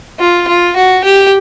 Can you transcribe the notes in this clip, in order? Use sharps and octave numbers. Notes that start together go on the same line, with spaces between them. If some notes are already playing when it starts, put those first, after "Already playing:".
F4
F4
F#4
G4